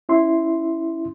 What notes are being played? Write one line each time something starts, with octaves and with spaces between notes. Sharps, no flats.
C#4 E4 C6